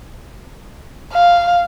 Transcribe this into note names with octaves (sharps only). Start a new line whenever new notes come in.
F5